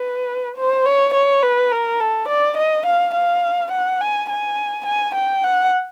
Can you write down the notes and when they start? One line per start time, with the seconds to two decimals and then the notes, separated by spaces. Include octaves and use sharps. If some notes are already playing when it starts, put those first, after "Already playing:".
Already playing: B4
0.57 C5
0.86 C#5
1.14 C#5
1.43 B4
1.72 A#4
2.00 A4
2.29 D5
2.57 D#5
2.86 F5
3.14 F5
3.72 F#5
4.01 G#5
4.29 G#5
4.86 G#5
5.15 G5
5.44 F#5